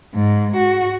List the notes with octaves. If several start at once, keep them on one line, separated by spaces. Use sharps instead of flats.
G#2
F#4